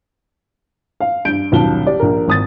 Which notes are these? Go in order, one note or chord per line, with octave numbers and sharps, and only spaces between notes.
F5
G2 G6 D7
D#1 B1 F4 A5 G7
G4 D5
A#1 A#4
G#1 D#6 A6